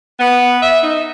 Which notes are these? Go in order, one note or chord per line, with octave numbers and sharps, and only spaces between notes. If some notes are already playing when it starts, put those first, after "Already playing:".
B3
E5
D#4